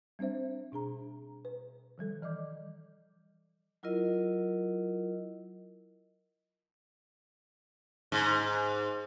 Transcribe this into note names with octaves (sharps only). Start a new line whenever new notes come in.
G3 C4 D4 C5 E5
B2 D4 G#4 A#5
B4
D#3 F3 G3 A4
E3 D5 D#5 D6 G6
F#3 E4 F4 A#4 D#5
G#2